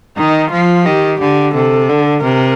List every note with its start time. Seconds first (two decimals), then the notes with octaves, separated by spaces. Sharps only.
0.17 D#3 D#4
0.51 F3 F4
0.86 D#3 G4
1.20 D3 G4
1.54 C3 A4
1.89 D3
2.23 C3 A#4